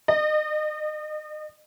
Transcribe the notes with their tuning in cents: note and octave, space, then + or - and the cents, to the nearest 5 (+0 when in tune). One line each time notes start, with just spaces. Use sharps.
D#5 -35